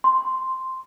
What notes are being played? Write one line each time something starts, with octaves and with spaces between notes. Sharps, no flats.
C6